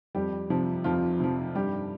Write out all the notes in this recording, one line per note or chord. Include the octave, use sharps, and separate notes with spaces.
F2 G3 G4
C3 F3
F2 F3 F4
C3 F3
G2 G3 G4